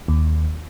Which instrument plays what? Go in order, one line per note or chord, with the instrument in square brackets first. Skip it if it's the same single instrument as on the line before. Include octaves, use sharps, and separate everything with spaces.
[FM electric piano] D#2